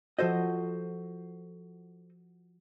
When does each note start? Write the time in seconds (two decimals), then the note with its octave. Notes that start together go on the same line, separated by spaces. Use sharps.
0.19 F3 F4 F#4 A4 C5 D#5